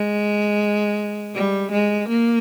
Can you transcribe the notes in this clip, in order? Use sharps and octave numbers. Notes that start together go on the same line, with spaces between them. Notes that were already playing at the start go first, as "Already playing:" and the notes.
Already playing: G#3
G3
G#3
A#3